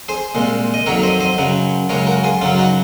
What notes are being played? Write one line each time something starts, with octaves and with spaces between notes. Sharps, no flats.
G#4 C5
C2 A#2 G#3
D#5
F2 D#3 F#3 A#4 C#5
C5 D#5
C5 D#5
F#2 C#3 F#3
F#2 C#3 G#3 A#4 C#5
F#4 A#4
F4 G#4
F#2 C#3 F#3 C#4 F4
D#4 F#4